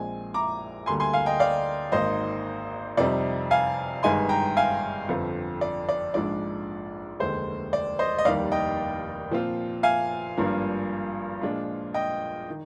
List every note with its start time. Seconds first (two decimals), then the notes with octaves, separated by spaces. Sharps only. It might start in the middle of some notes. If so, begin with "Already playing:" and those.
Already playing: A#1 A#2 G#3 C4 G#5
0.34 A#5 D6
0.86 D2 D3 G3 A#3 G#5 C6
1.00 G#5 C6
1.13 F5 G#5
1.26 D#5 G5
1.40 D5 F5
1.92 G#1 G#2 D#3 A#3 C5 D#5
2.97 F2 C3 G3 C4 D#4 D5
3.51 F5 G#5
4.03 G1 G2 D#3 G#3 D#4 G#5 C6
4.29 G5 A#5
4.57 F5 G#5
5.08 G1 F2 D3 F3 C4
5.61 D5
5.89 D5
6.14 A#1 G#2 F3 G#3 D4 D5
7.20 F1 D#2 D3 G#3 C5
7.73 D5
7.99 C5 D#5
8.18 D#5
8.25 F1 D#2 D#3 G3 D5 F5
8.52 D#5 G5
9.31 A#2 F3 C4 F4
9.83 F5 G#5
10.37 G#1 G2 F3 A#3 D4
11.41 A#2 F3 G#3 D4 F4
11.94 D#5 G5
12.50 D#3